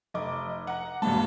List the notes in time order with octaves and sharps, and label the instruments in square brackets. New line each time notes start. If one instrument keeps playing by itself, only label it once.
[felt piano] F1 D#5 D6
F#5 A#5
[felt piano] E1 G2 A5 [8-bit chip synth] G#3 A#3